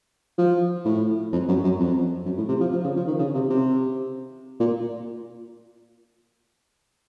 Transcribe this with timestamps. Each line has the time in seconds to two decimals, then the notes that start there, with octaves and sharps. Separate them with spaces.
0.38 F3
0.85 A2
1.33 F2
1.48 F#2
1.64 F#2
1.79 F2
2.25 F#2
2.38 A2
2.48 C3
2.60 F3
2.72 F3
2.84 C#3
2.96 F3
3.07 D#3
3.19 C#3
3.34 C3
3.50 C3
4.60 A#2